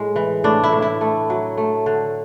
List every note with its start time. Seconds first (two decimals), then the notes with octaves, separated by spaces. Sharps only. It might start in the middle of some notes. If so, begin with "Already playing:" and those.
Already playing: A2 G#3
0.16 E3
0.44 A2 D4
0.64 E4
0.72 A2
0.82 E4
1.01 A3
1.30 F#3
1.57 A3
1.86 D3